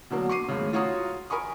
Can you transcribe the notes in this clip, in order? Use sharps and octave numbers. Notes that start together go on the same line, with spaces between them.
B2 D3 F#3 A#3
C#6 D6 C7 D#7
G#1 A2 C#3
F4 F#4 C#5 A#5 D#6
A#4 G#5 B5 C#6 D#6